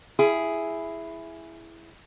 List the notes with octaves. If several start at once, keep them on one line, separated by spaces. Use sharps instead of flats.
E4 G#4